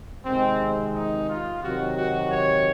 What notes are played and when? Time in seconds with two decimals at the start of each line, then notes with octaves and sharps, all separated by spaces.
0.25 C3 D#3 G#3 C4
0.94 D#4
1.29 F4
1.62 C3 D#3 F#3 F#4
1.97 F#4
2.31 C#5